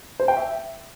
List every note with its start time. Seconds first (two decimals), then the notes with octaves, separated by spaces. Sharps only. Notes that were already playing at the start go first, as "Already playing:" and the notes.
0.20 C5
0.28 G5
0.37 E5